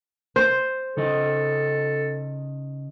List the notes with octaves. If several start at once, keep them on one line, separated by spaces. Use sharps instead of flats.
C5
C#3 D#4 A4 D#5